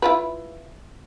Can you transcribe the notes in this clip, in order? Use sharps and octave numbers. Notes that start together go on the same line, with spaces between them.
E4 F4 B4